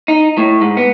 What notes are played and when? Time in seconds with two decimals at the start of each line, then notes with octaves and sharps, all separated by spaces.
0.08 D#4
0.38 A2
0.61 G#2
0.77 B3